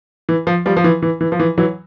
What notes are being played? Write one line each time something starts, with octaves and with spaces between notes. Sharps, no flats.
E3
F3
F3 G3
F3
E3
E3
E3
F3
E3
E3 F#3